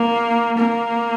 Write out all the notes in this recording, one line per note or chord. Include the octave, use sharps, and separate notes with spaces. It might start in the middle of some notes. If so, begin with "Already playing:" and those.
Already playing: A#3
A#3